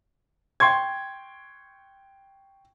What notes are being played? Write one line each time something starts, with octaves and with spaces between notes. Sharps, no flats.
G5 C6 C#6 G#6